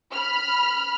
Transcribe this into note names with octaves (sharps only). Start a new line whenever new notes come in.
B5 F6